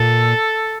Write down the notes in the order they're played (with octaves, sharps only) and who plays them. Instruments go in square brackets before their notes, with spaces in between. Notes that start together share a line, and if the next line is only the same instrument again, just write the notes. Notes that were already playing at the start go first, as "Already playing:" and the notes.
Already playing: [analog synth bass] A#2 [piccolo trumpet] A4